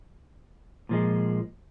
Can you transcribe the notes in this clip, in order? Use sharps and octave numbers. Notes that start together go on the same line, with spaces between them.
A#2 F3 G#3